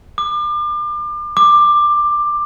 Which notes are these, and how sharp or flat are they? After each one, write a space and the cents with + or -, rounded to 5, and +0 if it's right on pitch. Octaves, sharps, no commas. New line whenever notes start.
D6 +35
D6 +15